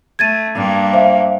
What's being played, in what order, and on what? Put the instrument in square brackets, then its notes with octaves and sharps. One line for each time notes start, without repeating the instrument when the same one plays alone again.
[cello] A3 [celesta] G#6 A6 D#7
[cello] G2 A#3
[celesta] C5 E5 F5